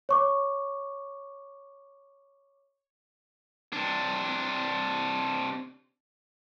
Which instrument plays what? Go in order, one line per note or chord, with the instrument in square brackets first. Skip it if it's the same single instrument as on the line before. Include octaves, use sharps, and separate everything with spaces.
[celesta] C#5 C#6 D6
[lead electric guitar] C3 D4